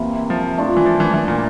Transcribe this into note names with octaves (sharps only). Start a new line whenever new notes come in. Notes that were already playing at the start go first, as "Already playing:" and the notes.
Already playing: C3 E3 A#3 E4
F3
A3 D4 F4
E3
F3
E3
E3
A#2